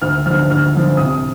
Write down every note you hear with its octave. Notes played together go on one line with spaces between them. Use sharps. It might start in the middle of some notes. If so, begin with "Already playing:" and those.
D2 F6
D3 F3 F6
D2 F6
D3 F3
C2 D#6